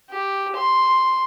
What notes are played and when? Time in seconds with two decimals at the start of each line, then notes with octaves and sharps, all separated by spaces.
0.10 G4
0.56 C6